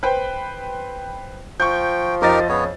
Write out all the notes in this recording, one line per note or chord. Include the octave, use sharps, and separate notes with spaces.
B4 C5 G5
F3 G5 C#6 G6
F2 D#4 G4 A#4 D#5 A6
C#3 B3 C#5